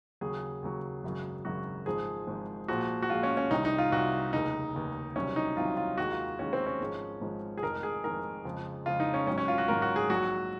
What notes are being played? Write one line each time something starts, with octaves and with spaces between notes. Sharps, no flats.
D#2 C#3 F#3 G#4
D#2 C#3 F#3
G#1 F#2 C#3 F#3
G#1 F#2 C#3 F#3 F#4
G#1 G#2 F3 G#3 G#4
G#1 G#2 F3 G#3
A#1 A#2 F3 G#3 F#4
F#4
A#1 A#2 F3 G#3 F4
C#4
C#4
C2 C3 D#3 D#4
D#4
F4
C2 C3 D#3 F#4
F1 D#2 C#3 D#4
F1 D#2 C#3
C2 C3 D#3 F#3 C#4
D#4
C2 C3 D#3 F#3 F4
F4
D#2 D#3 G#3 F#4
F4
D#2 D#3 G#3 C#4
C4
C#4
G#1 G#2 F3 G#3
G#1 G#2 F3 G#3
G#4
F1 F2 D#3 G#3 A#4
G#4
F1 F2 D#3 G#3 A#4
F2 C#3 F3 G#3
F2 C#3 F3 G#3 F4
D#4
C#4
G#1 G#2 D#3 F#3 C#4
C#4
F4
F#4
G#1 G#2 D#3 F#3 A#4
F#4
G#4
A#1 G#2 F#3 F#4